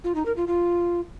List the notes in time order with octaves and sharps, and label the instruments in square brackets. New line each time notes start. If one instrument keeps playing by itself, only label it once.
[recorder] F4
D#4
A#4
F4
F4